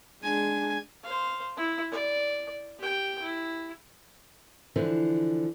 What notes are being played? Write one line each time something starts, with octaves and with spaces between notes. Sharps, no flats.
G#3 D4 G#5
C5 F5
E4
D5
G4 G5
E4
D3 E3 F3 C5